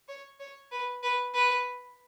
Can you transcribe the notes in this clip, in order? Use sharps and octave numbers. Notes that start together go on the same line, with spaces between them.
C#5
C#5
B4
B4
B4